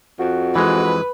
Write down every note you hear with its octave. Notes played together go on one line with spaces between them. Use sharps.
F2 F#4
E3 G#3 B4